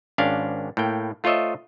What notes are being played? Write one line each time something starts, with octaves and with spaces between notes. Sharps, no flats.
G#1 C#4 D4 F5
A2 A#3 G5
A3 F4 C5 C#5 D#5 E5